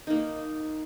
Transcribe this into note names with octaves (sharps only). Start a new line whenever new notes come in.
A#3 D#4